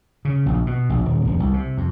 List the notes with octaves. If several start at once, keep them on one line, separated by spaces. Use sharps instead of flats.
C#3
A#1
B2
A#1
D#1
E1
C2
C3
F2